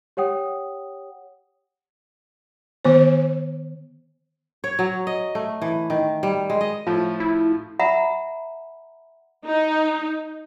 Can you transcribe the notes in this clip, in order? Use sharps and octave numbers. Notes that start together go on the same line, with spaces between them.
G4 C#5 F#5 G5 D#6
D#3 B3 C5
C#5
F#3
D#5
A3
E3
D#3
G3
G#3
D#5
A2 F3 F4
E4
E5 F#5 A#5 B5
D#4